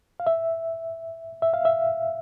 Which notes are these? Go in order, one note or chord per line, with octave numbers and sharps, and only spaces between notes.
F5
E5
E5
F5
E5